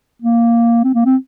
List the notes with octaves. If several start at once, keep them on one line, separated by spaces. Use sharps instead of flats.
A#3
C4
A#3
C4